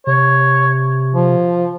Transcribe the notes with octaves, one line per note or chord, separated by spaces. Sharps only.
C3 C#5
F3